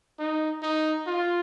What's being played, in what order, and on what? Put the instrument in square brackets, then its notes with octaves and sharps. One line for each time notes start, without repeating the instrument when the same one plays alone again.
[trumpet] D#4
D#4
F4